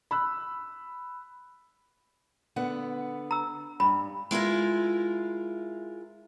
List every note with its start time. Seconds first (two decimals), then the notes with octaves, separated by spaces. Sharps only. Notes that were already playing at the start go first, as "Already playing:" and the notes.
0.11 B5 E6 F#6
2.56 D3 B3 F#5
3.31 A#5 E6
3.80 G2 B5
4.31 G#3 E4 F4 A#4